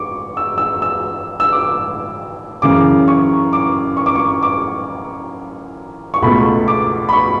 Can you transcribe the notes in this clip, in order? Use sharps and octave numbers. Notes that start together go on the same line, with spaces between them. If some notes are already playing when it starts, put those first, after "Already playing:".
Already playing: C#6 D6
E6
E6
E6
E6
D6
E6
F#2 C#3 E3 D6
C#6
D6
C#6
D6
C#6
D6
C#6
C#2 B2 A3 B5
D6
B5
C#6